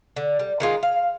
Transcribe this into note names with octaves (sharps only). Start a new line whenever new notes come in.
D3
G3
D#3 G#3 F4
F5